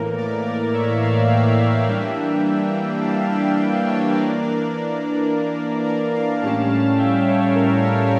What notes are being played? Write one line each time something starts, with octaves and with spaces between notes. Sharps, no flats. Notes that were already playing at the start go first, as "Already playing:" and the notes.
Already playing: A2 E3 A#3 A#4
A#4 D5
A#4 D5
C#5 E5
D5 F5
E5 G5
E3 G3 A#3 D4
F5 A5
E5 G5
E5 G5
C#5 E5
E3 A#3 D4 A#4 D5
A#4 D5
A#4 D5
D5 F5
A2 G3 C#4 F5 A5
F5 A5
E5 G5
C#5 E5
A#4
A4 C#5